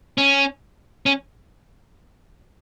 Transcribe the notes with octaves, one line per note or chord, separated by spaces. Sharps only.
C#4
C#4